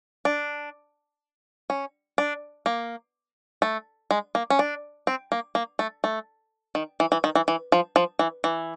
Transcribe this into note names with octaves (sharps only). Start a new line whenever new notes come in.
D4
C#4
D4
A#3
A3
G#3
A#3
C#4
D4
C4
A#3
A#3
A3
A3
D#3
E3
E3
D#3
E3
E3
F3
F3
E3
E3